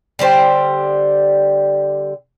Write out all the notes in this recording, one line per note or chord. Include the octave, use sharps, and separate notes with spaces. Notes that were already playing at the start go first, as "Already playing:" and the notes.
D3 G3 G4 C5